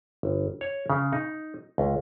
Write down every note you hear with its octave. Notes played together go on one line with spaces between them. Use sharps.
G1
C#5
C#3
D#4
C#2